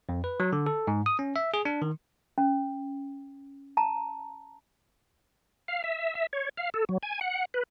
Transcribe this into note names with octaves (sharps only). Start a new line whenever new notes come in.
F2
B4
F#3
D3
A4
G#2
D#6
C#4
E5
G#4
D4
D#3
C#4
A5 A#5
F5
E5
E5
C#5
F5
A4
F#3
G#5
F#5
B4